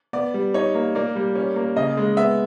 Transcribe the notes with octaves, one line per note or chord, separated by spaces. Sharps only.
B3 D5
G3
D#4 C#5
A#3
A#3 D5
G3
C#4
A#3
C#3 D#5
G#3
B3 E5